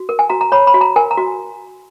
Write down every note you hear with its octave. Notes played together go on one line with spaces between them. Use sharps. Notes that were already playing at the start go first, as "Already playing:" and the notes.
Already playing: F#4
A#4
G#5
F#4 A#5
A#5
C#5 B5
B5
F#4
A#5
A#4 G#5
A#5
F#4